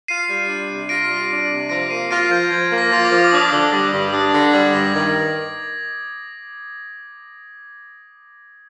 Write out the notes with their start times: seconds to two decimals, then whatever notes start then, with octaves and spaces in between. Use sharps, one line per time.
0.08 F4 C7 D#7
0.28 G3
0.49 D4
0.70 C3
0.89 F4 A#6 D7
1.09 G3
1.30 D4
1.50 C3
1.69 F3 A#6 D7
1.90 A#3 C7 D#7
2.11 F4 A#6 D7
2.31 F3 G6
2.51 F3 G#6
2.71 A#3
2.78 A#6
2.92 F4
3.04 D6
3.11 F3
3.24 D6
3.31 D4 D#6
3.52 D3
3.72 G3
3.92 G2
4.12 D4 D#6
4.32 D3 A#6
4.53 G3 G#6
4.73 G2 A#6
4.94 D#3 G#6